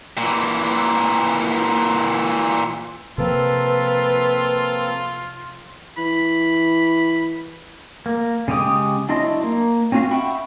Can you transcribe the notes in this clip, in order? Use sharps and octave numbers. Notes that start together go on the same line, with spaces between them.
A#2 E3
C3 F3 A#3 C4 F4 A4 B4
E3 B5
A#3
C#3 G#3 G4 D6 D#6
F#3 D4 E4 D#5 C6
A#3
C4 C#4 F4 F#4 F5
E5 F#5 G5 B5 C#6